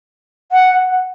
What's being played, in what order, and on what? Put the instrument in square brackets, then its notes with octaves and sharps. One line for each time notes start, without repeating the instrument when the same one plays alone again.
[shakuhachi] F#5